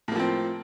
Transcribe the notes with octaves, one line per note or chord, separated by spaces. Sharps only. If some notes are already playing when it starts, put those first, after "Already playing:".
A2 F3 A#3 C4